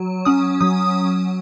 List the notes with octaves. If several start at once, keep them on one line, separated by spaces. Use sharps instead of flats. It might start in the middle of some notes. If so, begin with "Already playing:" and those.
Already playing: F#3
C#4 D#6
F#3 D#6